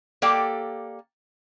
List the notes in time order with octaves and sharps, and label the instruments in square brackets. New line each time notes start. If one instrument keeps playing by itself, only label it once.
[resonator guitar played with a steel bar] A#3 G4 A4 D5 G5